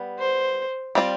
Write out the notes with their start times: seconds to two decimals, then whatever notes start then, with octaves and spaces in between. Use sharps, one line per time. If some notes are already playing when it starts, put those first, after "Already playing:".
Already playing: G3 B3
0.19 C5
0.95 G3 C4 F4 B4 D5